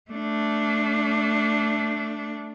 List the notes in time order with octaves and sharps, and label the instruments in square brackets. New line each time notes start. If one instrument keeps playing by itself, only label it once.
[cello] A3 D4